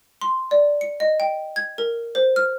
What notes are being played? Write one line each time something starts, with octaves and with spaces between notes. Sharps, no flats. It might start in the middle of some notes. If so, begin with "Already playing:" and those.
C6
D5
C#7
D#5
G5
G#6
A#4
C5
F6